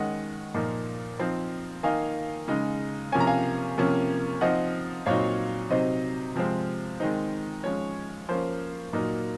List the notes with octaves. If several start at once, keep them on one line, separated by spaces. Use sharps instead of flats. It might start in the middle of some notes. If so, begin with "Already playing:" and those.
Already playing: D#3 G#3 C#4 D#5 F#5
A#2 F3 A#3 D#4
F3 C4 D#4
D#3 A#3 D#4 F5 G#5
C#3 G#3 D#4
C3 F3 A#3 C#4 G#5
A#5
F5 G#5
C3 F3 A#3 C#4
F3 C4 D#4 D#5 F#5
A#2 F#3 C4 D#4 C#5 F5
C3 F#3 C4 D#4 C5 D#5
C3 F3 G#3 C4
D#3 G#3 C4 D#4
F3 G#3 C#4 C#5
F3 A#3 C#4 C5
A#2 F#3 A#3 D#4